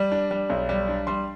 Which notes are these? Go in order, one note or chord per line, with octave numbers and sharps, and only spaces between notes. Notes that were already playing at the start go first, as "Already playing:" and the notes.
Already playing: G3
D4
G3
B1
G3
D4
G3 C6